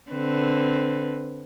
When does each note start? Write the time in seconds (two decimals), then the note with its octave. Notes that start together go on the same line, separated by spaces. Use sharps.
0.11 D3 C4 B4